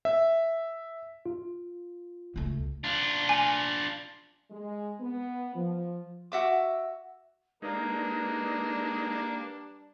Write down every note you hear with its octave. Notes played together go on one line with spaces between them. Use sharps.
E5
F4
C#2 A3
D4 F4
G#5
G#3
B3
F3
F#4 E5 D6
G3 G#3 A#3 D4 D#4 B4